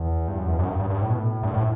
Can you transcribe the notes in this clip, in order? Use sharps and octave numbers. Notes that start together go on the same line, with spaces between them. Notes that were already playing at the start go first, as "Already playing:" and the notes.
Already playing: E2
G2
F#2
E2
F#2
G2
G2
G2
A2
B2
A2
G2
A2